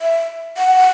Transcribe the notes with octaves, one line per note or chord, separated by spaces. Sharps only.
E5
F#5